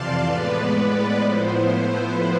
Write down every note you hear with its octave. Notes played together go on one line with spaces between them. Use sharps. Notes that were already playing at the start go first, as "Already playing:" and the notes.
Already playing: F2 C3 E3 D5 F5 A5 C6
A2 G#3 B3 B4 D5
B4
A2 F3 B3 E4 C5
B4